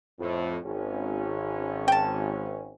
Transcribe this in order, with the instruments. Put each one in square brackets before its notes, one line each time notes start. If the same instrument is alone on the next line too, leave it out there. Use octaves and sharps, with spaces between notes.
[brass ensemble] F2 A2
G#1 C#4
[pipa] G5 A5